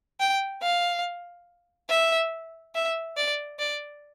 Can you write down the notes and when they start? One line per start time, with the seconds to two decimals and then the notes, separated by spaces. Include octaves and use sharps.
0.20 G5
0.63 F5
1.90 E5
2.75 E5
3.17 D5
3.59 D5